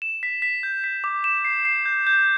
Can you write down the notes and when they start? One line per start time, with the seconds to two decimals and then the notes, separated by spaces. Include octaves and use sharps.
0.02 E7
0.23 B6
0.42 B6
0.63 G6
0.84 B6
1.04 D6
1.24 E7
1.45 C7
1.65 C7
1.86 G6
2.07 G6